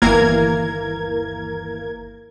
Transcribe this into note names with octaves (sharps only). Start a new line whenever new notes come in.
G1 D#2 E3 A#3 A#4 G#6